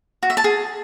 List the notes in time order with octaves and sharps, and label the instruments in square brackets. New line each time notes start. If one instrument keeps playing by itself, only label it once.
[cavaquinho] F#4
E5
A5
G#4